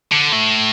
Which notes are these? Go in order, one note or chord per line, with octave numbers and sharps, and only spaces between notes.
D3
A2